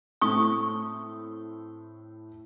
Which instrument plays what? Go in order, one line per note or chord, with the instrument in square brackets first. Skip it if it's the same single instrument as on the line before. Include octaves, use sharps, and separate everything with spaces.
[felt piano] A2 A3 C4 [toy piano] C#6 D#6